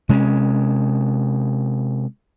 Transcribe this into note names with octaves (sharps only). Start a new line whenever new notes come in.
C3 G#3 C4 C#4